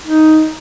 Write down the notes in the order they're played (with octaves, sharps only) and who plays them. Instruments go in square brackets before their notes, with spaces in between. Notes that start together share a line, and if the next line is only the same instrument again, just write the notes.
[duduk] D#4